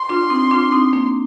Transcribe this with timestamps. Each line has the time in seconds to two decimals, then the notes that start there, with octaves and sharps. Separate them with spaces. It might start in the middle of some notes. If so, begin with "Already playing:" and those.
Already playing: C6
0.09 D4 F4
0.30 C4 D#4
0.51 D4 F4
0.72 C4 D#4
0.93 A#3 D4